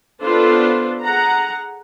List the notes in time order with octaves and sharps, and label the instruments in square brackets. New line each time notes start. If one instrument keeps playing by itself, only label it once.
[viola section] B3 D4 F4 A4 B4 C5
G#4 F#5 A#5